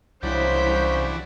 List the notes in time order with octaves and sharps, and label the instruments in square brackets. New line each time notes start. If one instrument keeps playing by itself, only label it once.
[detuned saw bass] C2 [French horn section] C#3 C5 [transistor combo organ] E3 F#3 D4 [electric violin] G6 B6